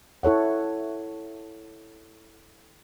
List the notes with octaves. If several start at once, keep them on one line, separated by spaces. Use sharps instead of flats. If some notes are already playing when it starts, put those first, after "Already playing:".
E4 A4 C#5 F#5